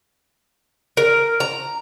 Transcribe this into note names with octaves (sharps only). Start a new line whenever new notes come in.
A#4
A#5